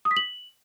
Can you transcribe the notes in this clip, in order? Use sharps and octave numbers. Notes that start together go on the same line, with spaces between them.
D#6
B6
F#7